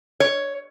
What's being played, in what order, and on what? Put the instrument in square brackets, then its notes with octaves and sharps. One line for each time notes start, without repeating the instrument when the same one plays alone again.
[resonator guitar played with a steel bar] C#5